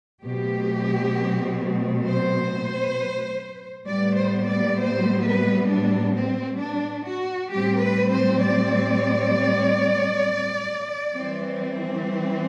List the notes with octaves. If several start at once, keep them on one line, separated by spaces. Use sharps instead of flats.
B2 F#3 A3 C4 G4
C5
A2 G3 B3 D5
C5
D5
C5
B4
D4
C4
D4
F#4
A2 G3 C4 G4
B4
C5
D5
E3 G3 C4